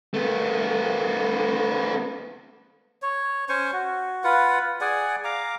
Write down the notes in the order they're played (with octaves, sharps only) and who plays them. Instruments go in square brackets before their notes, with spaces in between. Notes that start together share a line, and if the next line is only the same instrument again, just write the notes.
[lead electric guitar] A3 B3
[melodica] C#5
C#4 C5 G#5 C#6
F#4
F4 B4 F#5
G#4 D5 F#5 G#5
F5 A#5 D6